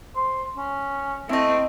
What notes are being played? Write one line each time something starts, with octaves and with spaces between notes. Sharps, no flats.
C5
C#4
A3 C4 E4 D#5